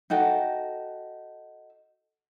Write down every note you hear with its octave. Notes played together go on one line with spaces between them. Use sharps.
D#4 F#4 A4 G5